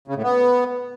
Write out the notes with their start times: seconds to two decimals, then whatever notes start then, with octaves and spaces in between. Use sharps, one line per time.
0.08 C#3
0.15 A2
0.23 B3